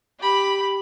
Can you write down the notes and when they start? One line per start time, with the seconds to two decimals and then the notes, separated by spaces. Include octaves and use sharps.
0.19 G4 B5